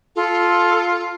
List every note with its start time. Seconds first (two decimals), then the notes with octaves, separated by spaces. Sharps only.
0.16 F4 A4